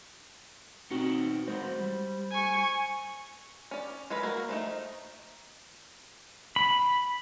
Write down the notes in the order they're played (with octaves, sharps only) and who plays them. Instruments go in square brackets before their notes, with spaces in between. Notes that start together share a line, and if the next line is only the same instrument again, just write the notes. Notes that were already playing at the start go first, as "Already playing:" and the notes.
[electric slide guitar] B2 D#4 G5 [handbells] C4 F#4 C#7
[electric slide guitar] E3 G#3 F#4 [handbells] C5
[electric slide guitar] G3
[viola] G#5 C#6
[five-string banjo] C#4 D5
G#3 F4 A4 B4
A#3 F#4 A#4
F3 A3 D#4
[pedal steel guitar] B5